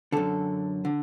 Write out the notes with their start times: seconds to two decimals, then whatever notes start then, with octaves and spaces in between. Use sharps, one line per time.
0.12 F#2 D3 A4
0.85 D3